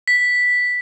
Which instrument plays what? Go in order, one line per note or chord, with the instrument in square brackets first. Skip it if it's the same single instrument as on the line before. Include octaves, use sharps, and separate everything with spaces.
[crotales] B6